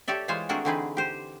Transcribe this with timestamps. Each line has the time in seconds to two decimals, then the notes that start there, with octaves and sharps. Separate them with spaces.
0.08 G4 A4 C#5 D5 E5
0.28 E3 G#3 F4 C5 C#5 G#5
0.49 A3 C4 D4 F#4 G#4 A#4
0.65 D3 E3 C4 D#4 G#4 B4
0.97 G4 C5